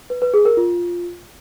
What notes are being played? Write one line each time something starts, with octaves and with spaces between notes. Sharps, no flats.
B4
B4
G#4
A#4
F4